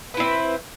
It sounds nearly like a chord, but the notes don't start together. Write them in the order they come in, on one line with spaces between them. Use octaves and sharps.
B4 E4 C4